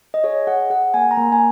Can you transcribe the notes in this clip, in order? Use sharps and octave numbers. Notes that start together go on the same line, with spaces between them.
D#5
G#4 C#5
G#4 F#5
G#4 F#5
A#3 G#5
A#5
A#3 G#5
G#5